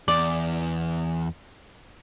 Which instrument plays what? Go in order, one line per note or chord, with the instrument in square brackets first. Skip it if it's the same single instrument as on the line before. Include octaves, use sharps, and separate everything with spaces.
[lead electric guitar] E2 [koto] D5